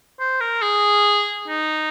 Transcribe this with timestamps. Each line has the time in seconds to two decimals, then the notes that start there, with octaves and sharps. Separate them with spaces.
0.20 C5
0.41 A#4
0.62 G#4
1.48 D#4